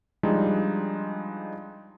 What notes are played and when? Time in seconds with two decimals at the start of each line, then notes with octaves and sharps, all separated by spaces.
0.23 F3 G3 G#3 D4 D#4